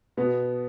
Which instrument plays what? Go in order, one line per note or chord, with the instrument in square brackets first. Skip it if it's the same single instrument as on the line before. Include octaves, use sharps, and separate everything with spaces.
[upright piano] B2 B3